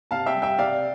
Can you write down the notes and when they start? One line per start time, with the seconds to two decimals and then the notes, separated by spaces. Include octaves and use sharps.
0.11 C3 F5 A5
0.26 E5 G5
0.34 G3
0.42 E5 G5
0.58 C3 D5 F5